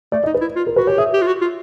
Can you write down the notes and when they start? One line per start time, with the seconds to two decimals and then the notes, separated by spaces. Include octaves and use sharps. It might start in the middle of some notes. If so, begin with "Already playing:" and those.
0.12 A3 D5
0.24 D#4 D#5
0.34 B4
0.41 E4
0.56 F4
0.67 A#4
0.76 F#4 B4
0.87 G4 C#5
0.98 G#4 E5
1.14 G4
1.22 F4
1.27 F#4
1.41 F4